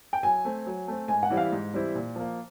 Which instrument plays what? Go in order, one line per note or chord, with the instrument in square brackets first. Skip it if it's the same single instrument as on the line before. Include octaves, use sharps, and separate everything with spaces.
[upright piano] G5
[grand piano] F#3 [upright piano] G#5
[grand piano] A3 C4
F#3
A3 C4
[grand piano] G#2 [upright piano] G#5
[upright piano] F#5
[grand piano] E3 G3 C4 E4
[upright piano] F5
[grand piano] G#2
E3 G3 C4 E4
A#2
F3 A#3